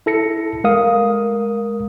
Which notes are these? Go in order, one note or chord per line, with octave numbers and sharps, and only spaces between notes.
E4 A4 A#6 C#7
G#3 A#4 F5 D#6